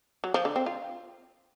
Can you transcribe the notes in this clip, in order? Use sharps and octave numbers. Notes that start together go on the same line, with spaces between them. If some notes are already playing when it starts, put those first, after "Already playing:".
F#3
F3
D3
C4
F4